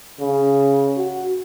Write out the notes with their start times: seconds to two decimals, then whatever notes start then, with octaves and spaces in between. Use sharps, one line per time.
0.21 C#3
0.97 F#4